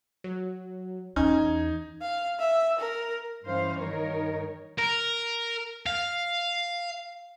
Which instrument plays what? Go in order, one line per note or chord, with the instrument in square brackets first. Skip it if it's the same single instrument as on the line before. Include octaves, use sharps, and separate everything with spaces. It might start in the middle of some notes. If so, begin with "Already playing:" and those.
[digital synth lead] F#3
[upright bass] E2 [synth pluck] C#4 [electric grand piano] D#4 [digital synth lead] G#6
[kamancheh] F5
E5
A#4
[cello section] G2 E3 C#4 C5 F5
G2 D#3 D#4 A#4 C#5
[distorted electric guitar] A#4
F5